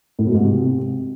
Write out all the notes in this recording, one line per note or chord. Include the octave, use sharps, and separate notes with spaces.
A2
B2
G#2
C3